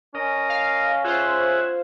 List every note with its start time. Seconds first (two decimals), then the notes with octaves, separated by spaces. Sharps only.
0.15 C#4 A#4 D#5
0.49 F5
1.04 F4 G#4 C5 E5 F#5